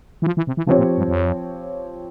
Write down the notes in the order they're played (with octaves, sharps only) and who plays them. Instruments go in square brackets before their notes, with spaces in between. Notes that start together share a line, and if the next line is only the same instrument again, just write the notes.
[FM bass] E3
F3
E3
C3
E3
[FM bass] C#3 [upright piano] F3 C4 G4 C#5
[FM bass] A#2
G2
F2